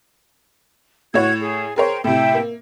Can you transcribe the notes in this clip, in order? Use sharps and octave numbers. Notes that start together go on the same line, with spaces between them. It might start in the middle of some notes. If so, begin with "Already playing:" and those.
A2 F#4 C#5 G#6
G#4
G#4 A#4 C5 C#5 G5
A2 C3 E5 G5
A#3